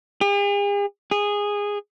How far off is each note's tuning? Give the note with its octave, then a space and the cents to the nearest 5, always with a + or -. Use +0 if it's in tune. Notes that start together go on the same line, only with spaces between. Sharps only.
G#4 -45
G#4 -15